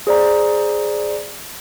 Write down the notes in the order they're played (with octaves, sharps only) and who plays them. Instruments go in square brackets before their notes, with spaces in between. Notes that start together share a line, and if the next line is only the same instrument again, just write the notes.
[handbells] G#4 C5 D5 A#5